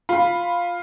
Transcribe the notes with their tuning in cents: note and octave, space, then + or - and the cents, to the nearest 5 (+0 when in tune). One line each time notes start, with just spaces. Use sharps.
F4 +5 B5 +0